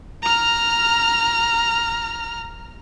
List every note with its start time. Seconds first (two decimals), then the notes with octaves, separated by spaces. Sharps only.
0.23 A#5 F6